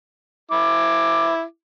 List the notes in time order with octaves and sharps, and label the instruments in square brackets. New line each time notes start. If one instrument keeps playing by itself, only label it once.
[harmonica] E4 D6